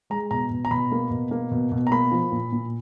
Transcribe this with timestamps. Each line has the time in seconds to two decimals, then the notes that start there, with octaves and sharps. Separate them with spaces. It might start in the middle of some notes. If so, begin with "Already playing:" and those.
0.10 G#3 A#5
0.31 B2 A#5
0.51 B2
0.65 A#5
0.71 B2 B5
0.92 A#3
1.11 B2
1.31 A#3
1.51 B2
1.72 B2
1.87 A#5
1.91 A#3 B5
2.11 F3
2.32 A#2
2.52 A#2